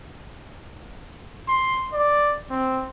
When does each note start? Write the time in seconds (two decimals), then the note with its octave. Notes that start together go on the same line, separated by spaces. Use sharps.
1.48 C6
1.93 D5
2.50 C4